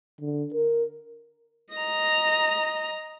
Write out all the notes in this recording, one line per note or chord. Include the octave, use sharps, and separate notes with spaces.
D3
A#4
D#5 A#5